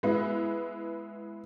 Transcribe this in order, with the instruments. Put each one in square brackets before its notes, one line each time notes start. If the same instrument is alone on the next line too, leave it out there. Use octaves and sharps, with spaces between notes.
[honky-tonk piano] G#3 B3 E4